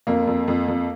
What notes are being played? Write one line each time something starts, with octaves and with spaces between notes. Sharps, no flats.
F2 A#3
F2
F2
F2